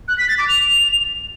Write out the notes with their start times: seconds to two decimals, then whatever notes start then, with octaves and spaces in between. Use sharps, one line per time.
0.08 F#6
0.18 B6
0.28 A6
0.38 D6
0.49 F7